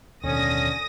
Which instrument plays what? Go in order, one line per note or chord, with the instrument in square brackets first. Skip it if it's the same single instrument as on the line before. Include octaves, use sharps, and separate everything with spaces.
[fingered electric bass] D#2 B2 D#3 [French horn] D3 [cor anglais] C#4 [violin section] D#6 A#6